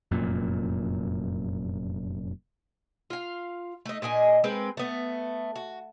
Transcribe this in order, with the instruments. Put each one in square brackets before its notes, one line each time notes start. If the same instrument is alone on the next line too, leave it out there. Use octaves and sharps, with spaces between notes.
[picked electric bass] F1 F#2 A#2
[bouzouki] F4 F5
A3 D#4
A#2 D4 D#5 G#5
G#3 C4 A#4 B4
A3 B3
F#4